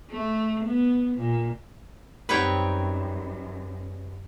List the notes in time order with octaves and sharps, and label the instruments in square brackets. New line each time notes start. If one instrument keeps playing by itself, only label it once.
[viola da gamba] A3
B3
A#2
[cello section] F#2 [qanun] G3 C4 D#4 [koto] B4 C#5 G5